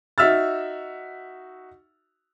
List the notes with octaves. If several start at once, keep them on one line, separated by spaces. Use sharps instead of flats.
D#4 F#4 E5 E6 F6 A6